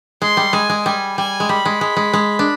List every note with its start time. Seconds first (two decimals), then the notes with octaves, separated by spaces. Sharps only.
0.22 G#3 C6
0.37 G3
0.53 G#3 G#5
0.70 G#3
0.86 G3 G#5
1.17 G3 G#5
1.40 G#3
1.49 G3 B5
1.65 G#3
1.81 G#3
1.97 G#3
2.13 G#3
2.39 D4